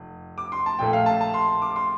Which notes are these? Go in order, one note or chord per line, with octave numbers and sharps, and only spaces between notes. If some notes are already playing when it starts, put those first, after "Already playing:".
Already playing: F1
D6
C6
A5
A#1 A#2 A3 G5
F5
A5
A5
C6
D6
C6